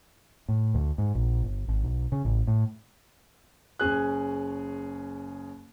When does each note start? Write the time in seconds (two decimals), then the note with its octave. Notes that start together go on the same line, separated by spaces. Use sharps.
0.49 A2
0.74 D2
0.98 G#2
1.15 A#1
1.43 G1
1.68 G#1
1.83 B1
2.12 C#3
2.25 A1
2.47 A2
3.80 F#1 C#4 G#4 F#6